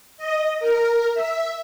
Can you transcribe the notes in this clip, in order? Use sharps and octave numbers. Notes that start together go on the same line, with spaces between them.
D#5
A#4
E5